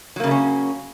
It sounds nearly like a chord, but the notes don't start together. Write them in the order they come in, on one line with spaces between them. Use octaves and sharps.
F#3 A#3 C#3 A3 C#4